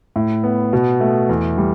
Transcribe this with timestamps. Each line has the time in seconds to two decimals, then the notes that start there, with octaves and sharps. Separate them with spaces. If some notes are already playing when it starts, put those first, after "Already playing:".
0.16 A2
0.44 B3
0.73 B2
1.00 A3
1.29 E2
1.58 G3